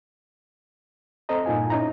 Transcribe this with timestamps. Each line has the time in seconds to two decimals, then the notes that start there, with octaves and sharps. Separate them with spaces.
1.29 C4 A4 C5 D#5 A#5
1.46 G2 A#2 D#4 F4 G#5
1.70 C#4 D#4 E4 A#5